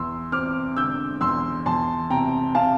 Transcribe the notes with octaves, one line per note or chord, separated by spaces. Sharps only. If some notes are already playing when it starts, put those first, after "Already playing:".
Already playing: E2 C6 E6
C4 D6 F6
D3 E6 G6
E2 C6 E6
E2 A5 C6
C3 G5 A#5
C3 F5 A5